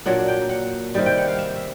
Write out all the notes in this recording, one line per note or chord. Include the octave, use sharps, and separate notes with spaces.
A#2 F#3 A#3 D4 F#5
G5
F#5
C3 D#3 G3
G5
F#5
F5
E5
E5